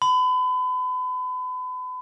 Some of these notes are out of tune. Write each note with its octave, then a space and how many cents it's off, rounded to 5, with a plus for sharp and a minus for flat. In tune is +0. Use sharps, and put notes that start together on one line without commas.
B5 +35